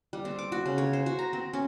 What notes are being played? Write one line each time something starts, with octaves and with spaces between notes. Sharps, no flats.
G3
C4
D6
F#4
C#3
C#5
C5
F#4
A#5
C4
C#4